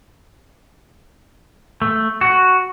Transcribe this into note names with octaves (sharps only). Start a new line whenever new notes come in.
A3
F#4